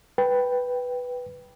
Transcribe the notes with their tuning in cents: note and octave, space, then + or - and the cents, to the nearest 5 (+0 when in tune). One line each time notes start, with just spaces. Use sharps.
B4 +0 G5 +0